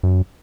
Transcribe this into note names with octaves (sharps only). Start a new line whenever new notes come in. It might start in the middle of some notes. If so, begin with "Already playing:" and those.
F#2